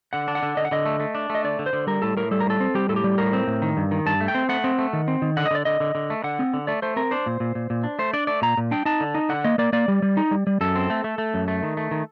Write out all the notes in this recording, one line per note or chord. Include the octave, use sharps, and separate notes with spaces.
D3 F#5
D4
F#5
D3
D3 D#5
F#5
D3 D#5
A3
A3
D4
A3
D#5
D3 D5
D3
C5
D3
G3 A#4
A2 A4
A2 A#4
G3 A4
A#4
A2 A4
C4
G3 G4
A2 A4
G4
G3
A2 A#4
C4
A2
D#3
G2
D#3
G2 A5
A3
G5
C4
A3 F#5
C4
A3
D#3
C4
D#3
D3 F#5
D#5
D3 D5
D3 D#5
D3
D3
A3
D3 F#5
C4
D3
A3 D5
A3 C5
C4 A#4
D4 C5
A#2
A#2
A#2
A#2
D4
A3 C5
D4 D5
A3 D5
A#2 A#5
A#2
D4 G5
D#4 A5
D3
D#4
D3 F#5
A#3 D#5
A#3 D5
A#3 D5
G3
G3
D#4
G3
G3
F#2 A4
C4
A3
A3
A3
F#2
A3
D#3
A3
D#3